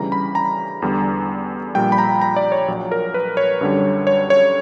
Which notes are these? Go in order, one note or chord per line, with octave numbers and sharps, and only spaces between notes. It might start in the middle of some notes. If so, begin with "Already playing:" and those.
Already playing: D2 C#3 E3 G3 A#5
B5
A#5
E2 D3 G3
A#1 A#2 G3 G5
B5
A#5
A#5
D5
C#5
A#1 A#2 F#3
A#4
B4
C#5
F#2 D3 G3
C#5
C#5